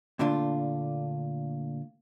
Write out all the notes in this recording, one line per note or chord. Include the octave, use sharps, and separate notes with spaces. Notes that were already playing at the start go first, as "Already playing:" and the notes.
A#2 D3 A3 D4 F4